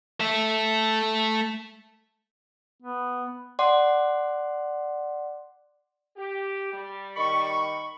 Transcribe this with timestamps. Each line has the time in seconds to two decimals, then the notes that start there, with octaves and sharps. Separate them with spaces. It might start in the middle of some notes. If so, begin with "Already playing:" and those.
0.20 A3 E5
2.82 B3
3.59 D5 F#5 C6 D6
6.16 G4
6.72 G3
7.16 D#3 B5 C#6